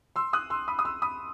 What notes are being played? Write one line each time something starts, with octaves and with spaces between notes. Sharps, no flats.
C6 E6
D#6 F#6
C6 E6
B5 D#6
D#6
C6 E6
B5 D#6